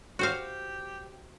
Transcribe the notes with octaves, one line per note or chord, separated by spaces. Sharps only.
F#4 G4 C5 F5